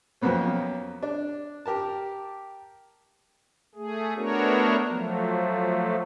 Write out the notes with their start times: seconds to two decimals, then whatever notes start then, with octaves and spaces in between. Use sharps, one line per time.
0.22 F2 F3 F#3 A#3 B3 C#4
1.03 D4
1.66 G4 A#4 A5
3.75 A3 G#4
4.16 A3 B3 D4 F#4 A#4 C#5
4.87 F3 F#3 A3